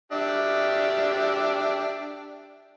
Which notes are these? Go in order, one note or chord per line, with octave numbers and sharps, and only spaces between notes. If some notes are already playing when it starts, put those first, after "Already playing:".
D4 G4 E5